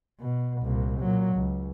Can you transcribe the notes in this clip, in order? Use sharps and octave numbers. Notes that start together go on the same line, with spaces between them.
B2
C2 A#2
A#2 F#3
C#2